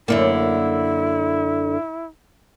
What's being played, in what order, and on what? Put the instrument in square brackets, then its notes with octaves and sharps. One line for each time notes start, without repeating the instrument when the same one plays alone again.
[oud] F#2 D3 A#3 [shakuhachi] E4